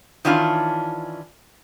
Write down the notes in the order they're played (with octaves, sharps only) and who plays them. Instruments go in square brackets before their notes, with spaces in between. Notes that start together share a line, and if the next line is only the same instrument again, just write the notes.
[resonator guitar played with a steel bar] D#3 E3 C#4 D4 F4